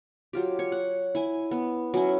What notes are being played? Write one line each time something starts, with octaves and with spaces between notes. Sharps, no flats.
F#3 F4 G4
C#5
F#5
E4 G#5
B3
F#3 C#4 E4